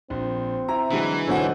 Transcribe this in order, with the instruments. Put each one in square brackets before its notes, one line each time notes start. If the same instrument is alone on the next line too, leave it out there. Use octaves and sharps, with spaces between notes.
[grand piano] A#1 [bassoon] C4
[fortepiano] E4 [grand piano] E5 A#5
[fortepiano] D3 F#3 G#3 [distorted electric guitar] E3
[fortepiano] D2 G#2 D3 [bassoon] F#3 [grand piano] A4 C5 F#5